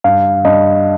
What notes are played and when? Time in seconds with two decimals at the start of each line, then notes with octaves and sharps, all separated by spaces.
0.04 G2 F5
0.45 G2 D#5